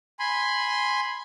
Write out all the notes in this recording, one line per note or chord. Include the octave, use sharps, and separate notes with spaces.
G#5 B5 C6